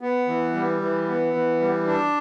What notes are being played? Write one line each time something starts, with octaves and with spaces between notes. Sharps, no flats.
B3
E3
G3
E3
B3
E3
G3
D4